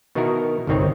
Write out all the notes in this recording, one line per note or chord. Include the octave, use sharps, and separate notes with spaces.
B2 D#3 D#4 E4 F#4 A#4
G1 C2 D#3 C4 D#4 C#5